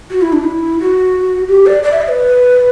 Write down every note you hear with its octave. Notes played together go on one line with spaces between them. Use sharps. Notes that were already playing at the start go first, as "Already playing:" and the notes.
F#4
E4
D4
E4
F#4
G4
D5
D5
E5
D5
B4